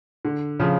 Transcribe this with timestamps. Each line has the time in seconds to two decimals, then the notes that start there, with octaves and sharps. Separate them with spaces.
0.25 D3
0.60 C#3 F3